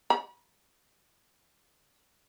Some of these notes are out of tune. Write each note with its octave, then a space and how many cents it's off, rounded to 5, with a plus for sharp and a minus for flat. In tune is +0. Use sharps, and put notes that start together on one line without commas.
B5 -30